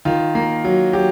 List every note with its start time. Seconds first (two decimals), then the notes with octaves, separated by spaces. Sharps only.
0.05 D#3 F4
0.35 A#3
0.64 F#3
0.93 F#3 G4